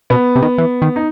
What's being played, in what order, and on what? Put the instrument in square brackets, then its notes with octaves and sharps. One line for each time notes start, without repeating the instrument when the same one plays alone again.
[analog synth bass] B2 [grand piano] B3
[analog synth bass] C3
D#3
E3
D#3
[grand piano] D#4